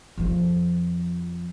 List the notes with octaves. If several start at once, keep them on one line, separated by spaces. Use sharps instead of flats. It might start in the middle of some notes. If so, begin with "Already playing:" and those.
F2 F3